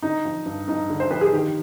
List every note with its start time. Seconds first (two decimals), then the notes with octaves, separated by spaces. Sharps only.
0.02 D3 D#4
0.25 F3
0.46 G2
0.68 G2 D#4
0.90 D3
1.00 C5
1.10 F3 B4
1.21 G#4
1.33 D#3 G4